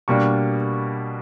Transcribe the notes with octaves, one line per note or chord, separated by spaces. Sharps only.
B2 G3 A#3 D4 C#6